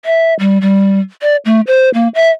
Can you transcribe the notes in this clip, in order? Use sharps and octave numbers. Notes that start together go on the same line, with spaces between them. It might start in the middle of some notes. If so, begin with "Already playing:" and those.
E5
G3
G3
D5
A3
C5
A#3
E5